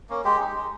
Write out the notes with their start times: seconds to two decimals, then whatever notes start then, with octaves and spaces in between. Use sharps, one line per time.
0.09 A#3 C#4
0.24 G#3 G4
0.40 D#4
0.55 G#3